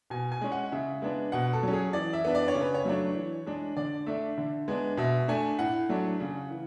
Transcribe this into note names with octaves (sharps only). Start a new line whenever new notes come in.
B2 G#5
G#5
G#3 C#4
F#5
C#3 E5
G#3 B3 D4
B2 F#5
A4
F#3 C#4
G#4
E3 D5
E5
B3 D4
D5
C#5
C#3
B4
C#5
F#3 A3 D4
E3
G#3 D4
D3 D5
A3 D4 E5
D3
G#3 B3 D4
B2 E5
A3 D4 G#5
A2 F#5
F#3 A3 D4
C#3
E3